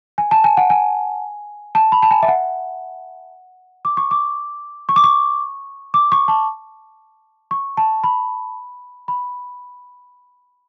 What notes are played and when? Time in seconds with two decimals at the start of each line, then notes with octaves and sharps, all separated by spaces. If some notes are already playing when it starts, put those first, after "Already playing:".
0.18 G#5
0.31 A5
0.44 G#5
0.57 F#5
0.70 G#5
1.75 A5
1.92 B5
2.02 A5
2.11 G#5
2.23 E5
2.28 F#5
3.85 D6
3.97 C#6
4.11 D6
4.89 C#6
4.96 D6
5.04 C#6
5.94 D6
6.12 C#6
6.28 A5
7.51 C#6
7.77 A5
8.04 B5
9.08 B5